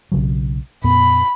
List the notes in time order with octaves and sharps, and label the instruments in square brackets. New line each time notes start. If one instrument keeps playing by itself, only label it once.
[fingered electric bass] B1 C#3 F#3
[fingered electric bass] F2 A#2 B3 [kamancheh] B5